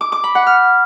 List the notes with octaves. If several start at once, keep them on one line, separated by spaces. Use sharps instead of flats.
D6
D6
B5
F#5
F6